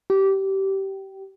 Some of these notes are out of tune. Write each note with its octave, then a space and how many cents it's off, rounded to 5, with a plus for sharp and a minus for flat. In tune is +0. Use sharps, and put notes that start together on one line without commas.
G4 -20